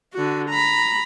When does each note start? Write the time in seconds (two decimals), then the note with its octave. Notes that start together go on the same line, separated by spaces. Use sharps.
0.14 D3 F#4
0.50 A#5 B5